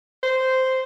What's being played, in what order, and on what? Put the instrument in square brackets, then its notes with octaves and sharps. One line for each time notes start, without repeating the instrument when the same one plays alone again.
[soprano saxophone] C5